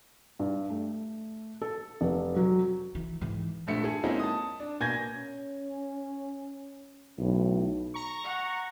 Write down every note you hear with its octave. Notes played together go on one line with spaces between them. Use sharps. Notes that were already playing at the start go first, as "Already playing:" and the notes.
G2
A3
A4
F1
F#3
E3
G#2 E3
A#1 G2 A3 E5 C#7
G#4 A4
G#3 A#3 C4 C#4 D#4 E4
A5 D#6
D4
B2 A#3 G#5 G6 G#6 A#6
C#4
B1 A2
A#5 C#6
F#5